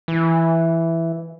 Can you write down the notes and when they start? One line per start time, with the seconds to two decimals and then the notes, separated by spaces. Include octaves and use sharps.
0.08 E3